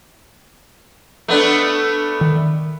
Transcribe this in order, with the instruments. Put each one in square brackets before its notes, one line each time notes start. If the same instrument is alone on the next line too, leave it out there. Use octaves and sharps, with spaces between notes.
[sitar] A3 B3 D4
[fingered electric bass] D#3